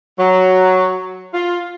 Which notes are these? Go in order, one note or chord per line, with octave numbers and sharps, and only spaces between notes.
F#3
F4